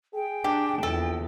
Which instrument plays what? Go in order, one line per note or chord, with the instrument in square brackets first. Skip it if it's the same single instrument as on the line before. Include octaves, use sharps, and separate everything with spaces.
[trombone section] G#4 [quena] G5
[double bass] D4 [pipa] G4
[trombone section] A#1 [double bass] E2 [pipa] A4